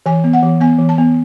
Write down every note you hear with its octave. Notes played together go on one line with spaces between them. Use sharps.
E3 G#5
B3
F#5
E3
B3 G#5
E3
A5
B3